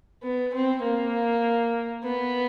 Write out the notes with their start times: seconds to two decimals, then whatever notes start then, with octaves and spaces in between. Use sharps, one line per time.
0.23 B3
0.53 C4
0.83 A#3
2.04 B3